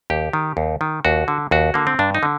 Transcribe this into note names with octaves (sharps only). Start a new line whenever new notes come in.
D#2 G4
D#3
D#2
D#3
D#2 F#4
D3
D#2 F#4
D3 A#3
C4
G2 D4
D#4
D3